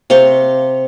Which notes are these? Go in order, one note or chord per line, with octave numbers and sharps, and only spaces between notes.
C3 F5 C6 C#6